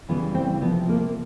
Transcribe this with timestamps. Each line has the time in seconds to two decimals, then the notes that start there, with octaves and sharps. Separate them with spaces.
0.09 C#3 E3 G3 B3
0.35 C4
0.62 C3 F3 B3
0.89 A#3